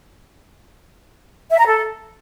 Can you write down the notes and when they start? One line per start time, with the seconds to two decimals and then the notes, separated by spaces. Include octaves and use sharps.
1.50 E5
1.58 A#5
1.66 A4